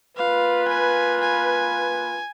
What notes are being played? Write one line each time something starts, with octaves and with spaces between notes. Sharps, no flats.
A#3 F4 B4 F5
G#5
G#5